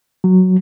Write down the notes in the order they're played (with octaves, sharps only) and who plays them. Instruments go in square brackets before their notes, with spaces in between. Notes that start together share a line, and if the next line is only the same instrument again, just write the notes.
[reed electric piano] F#3